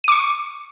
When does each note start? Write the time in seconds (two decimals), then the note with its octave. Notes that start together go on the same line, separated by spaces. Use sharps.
0.04 D#7
0.08 D6
0.12 C#6